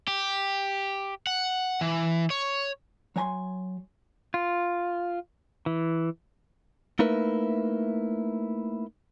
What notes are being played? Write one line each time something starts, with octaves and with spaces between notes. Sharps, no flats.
G4
F#5
E3
C#5
F#3 C#5 G#5 A#5 C6
F4
E3
A3 A#3 D#4 E4 A#4 B4